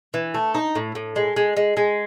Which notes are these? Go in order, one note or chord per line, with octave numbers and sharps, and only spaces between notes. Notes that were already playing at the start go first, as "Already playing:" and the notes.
E3
A3
D#4
A2
A2
G#3
G#3
G#3
G#3